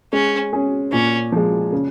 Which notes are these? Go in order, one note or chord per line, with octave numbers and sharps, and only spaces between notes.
G#3 C#4
C#4 G#4
A#2 C#4
F3 G#3
C#3